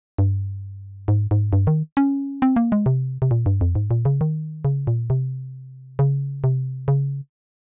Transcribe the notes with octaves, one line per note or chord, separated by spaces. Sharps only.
G2
G#2
G#2
G2
D#3
C#4
C4
A#3
G#3
C3
C3
A#2
G2
F2
G#2
A#2
C#3
D#3
C#3
A#2
C3
C#3
C3
C#3